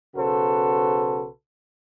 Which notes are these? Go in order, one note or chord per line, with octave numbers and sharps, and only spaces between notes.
B1 C#3 F#4 A4 B4 C5